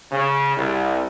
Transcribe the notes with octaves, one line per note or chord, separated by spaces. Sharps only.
C#3
C2